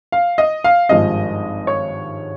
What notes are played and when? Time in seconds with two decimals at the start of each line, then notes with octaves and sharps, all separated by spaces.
0.12 F5
0.38 D#5
0.64 F5
0.89 G#1 G2 F3 G#3 D#5
1.67 C#5